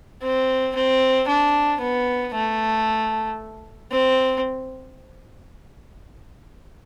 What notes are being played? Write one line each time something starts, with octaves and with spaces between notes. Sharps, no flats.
C4
C4
D4
B3
A3
C4